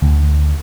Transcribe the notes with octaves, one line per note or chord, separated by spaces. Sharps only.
D2